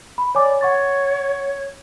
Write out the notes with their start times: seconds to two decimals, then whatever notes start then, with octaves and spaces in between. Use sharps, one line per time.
0.18 B5
0.35 C#5 D5 G#5 D6
0.61 C#5 F#5 C#6 A6